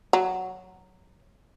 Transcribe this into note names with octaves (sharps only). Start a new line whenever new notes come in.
F#3